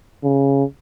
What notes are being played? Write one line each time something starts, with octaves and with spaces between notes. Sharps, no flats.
C#3